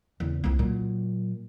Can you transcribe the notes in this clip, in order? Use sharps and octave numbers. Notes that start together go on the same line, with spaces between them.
E2 C#3
C2 C4
A#2 F#3